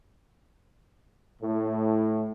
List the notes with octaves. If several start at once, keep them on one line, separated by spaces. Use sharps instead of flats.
A2